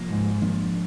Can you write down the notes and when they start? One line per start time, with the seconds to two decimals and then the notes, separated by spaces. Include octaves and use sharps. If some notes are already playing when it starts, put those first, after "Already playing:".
Already playing: C3 F3 A#3
0.10 G#2
0.42 F3 A#3 D4